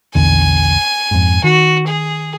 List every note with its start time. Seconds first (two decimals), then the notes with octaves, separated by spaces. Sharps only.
0.15 A#1 E2 D3 G#5
1.11 F2 G#2
1.44 D#3 F#4
1.87 G#4